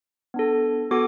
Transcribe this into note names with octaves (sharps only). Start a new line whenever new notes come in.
B3 D4 A4
B3 F#4 A4 D6